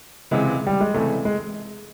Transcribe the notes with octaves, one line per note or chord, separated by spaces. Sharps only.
C#2 C3 E3 G#3
G3
G#3
C#2 C3 E3 A3
G#3